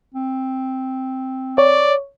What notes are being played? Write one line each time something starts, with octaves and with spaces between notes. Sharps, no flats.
C4
C#5 D5